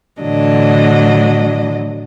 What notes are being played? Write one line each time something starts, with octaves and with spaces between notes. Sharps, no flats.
A2 D3 E3 F#3 D4 D#5